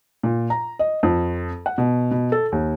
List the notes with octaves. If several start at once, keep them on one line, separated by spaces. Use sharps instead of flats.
A#2
A#5
D#5
F2
F#5
B2
B2
A4
D#2